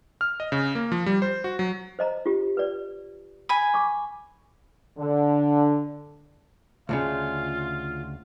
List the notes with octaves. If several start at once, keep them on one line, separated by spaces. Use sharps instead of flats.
F6
D#5
C#3
A#3
F3
G3
C5
F#4
F#3
C5 D#5 A#5
F4 G4
B4 D5
G#5 B5
C#6 D6
D3
D2 A2 C#3 F4 F5